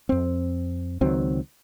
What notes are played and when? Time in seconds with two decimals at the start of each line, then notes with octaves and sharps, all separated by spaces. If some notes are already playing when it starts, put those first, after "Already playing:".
0.09 F2 C4
1.01 C#2 D#3 F#3 C4